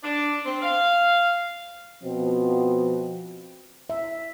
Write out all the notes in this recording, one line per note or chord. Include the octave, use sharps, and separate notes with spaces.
D4
C4
F5
B2 F3 C4
E5